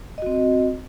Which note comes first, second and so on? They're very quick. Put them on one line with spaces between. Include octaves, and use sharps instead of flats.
D#5 F#4 C4